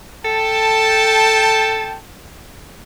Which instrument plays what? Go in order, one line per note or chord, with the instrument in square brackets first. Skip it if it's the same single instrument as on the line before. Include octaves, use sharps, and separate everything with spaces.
[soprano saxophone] A4 [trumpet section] G5 A5